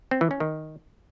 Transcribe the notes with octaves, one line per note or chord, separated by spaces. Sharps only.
C4
E3
C#4
D#3